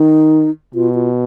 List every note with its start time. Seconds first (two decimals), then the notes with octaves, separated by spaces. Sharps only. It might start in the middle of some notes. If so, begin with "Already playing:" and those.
Already playing: D#3 D#4
0.74 B2 F4
0.94 F4